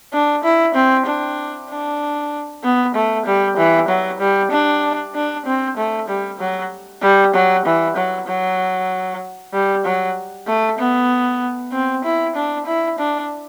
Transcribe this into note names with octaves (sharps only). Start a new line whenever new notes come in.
D4
E4
C4
D4
D4
B3
A3
G3
E3
F#3
G3
D4
D4
C4
A3
G3
F#3
G3
F#3
E3
F#3
F#3
G3
F#3
A3
B3
C4
E4
D4
E4
D4